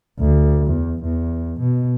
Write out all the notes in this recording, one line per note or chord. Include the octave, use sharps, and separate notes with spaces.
D2
E2
E2
B2